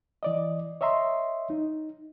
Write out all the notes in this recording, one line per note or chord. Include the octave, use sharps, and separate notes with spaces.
E3 D5 D#5
C#5 D#5 E5 A#5 C6
D#4